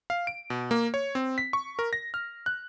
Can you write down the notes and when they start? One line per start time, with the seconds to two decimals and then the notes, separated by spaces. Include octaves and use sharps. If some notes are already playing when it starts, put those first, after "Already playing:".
0.10 F5
0.27 D7
0.50 B2
0.71 A#3
0.94 C#5
1.15 C4
1.38 B6
1.53 C#6
1.79 A#4
1.93 A#6
2.14 F6
2.46 F#6